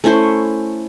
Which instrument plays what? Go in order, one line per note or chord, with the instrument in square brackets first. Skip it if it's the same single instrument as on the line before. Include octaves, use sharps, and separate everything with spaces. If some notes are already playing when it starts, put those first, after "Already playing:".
[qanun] A3 C#4 E4 C5